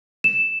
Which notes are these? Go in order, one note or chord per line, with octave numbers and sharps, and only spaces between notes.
E7